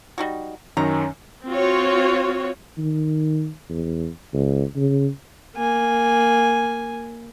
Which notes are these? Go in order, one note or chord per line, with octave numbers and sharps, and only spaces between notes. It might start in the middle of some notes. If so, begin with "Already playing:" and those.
G3 D#4 F#4
F#2 D#3 C#4 A#5
C4 F4 F#4 C#5
D#3
E2
C#2
C#3
A#3 G#5